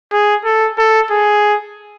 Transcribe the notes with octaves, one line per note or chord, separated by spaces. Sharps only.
G#4
A4
A4
G#4